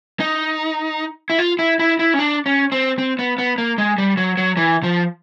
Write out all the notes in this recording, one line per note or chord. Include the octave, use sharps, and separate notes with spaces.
D#4
E4
F4
E4
E4
E4
C#4
D4
C#4
C4
C4
B3
B3
A#3
G#3
G3
F#3
F#3
E3
F3